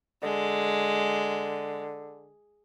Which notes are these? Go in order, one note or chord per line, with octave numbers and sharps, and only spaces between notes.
D3 G#3